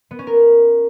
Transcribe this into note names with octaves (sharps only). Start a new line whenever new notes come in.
B3
C#4
A#4